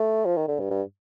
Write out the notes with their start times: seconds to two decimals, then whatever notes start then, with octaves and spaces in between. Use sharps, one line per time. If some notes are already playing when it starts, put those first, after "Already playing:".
Already playing: A3
0.25 F3
0.37 D#3
0.48 D3
0.59 G2
0.70 G2